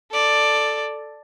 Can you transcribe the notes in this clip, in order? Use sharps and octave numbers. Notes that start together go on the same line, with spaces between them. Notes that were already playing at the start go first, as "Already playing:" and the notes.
A4 D5